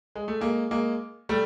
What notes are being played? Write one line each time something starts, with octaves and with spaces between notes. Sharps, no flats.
G#3
A3
G#3 A#3
G#3 A#3
G3 A3